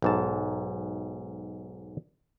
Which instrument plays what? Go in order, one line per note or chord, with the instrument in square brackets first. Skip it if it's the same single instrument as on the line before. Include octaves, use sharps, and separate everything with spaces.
[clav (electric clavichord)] B1 G#2 A5